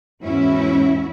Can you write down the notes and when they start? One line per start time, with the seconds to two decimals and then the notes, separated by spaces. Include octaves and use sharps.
0.22 E2 G#2 C#4 E4 F#4